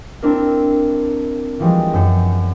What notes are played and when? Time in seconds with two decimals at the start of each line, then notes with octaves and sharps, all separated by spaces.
0.22 C4 D4 E4 A#4
1.60 E3 F3 G3 G#3 C4
1.93 F#2 G6 C#7